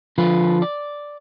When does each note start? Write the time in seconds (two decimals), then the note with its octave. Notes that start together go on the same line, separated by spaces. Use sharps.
0.18 D3 F3 F4 B4
0.62 D5